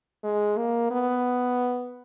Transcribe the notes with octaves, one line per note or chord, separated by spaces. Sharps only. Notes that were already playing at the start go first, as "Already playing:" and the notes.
G#3
A#3
B3